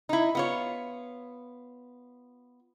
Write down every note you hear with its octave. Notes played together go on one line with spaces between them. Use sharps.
D#4 E4
B3 F4 C#5